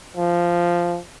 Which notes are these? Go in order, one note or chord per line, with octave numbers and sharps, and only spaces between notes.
F3